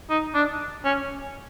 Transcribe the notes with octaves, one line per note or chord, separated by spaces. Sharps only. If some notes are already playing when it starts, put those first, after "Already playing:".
D#4
D4
C#4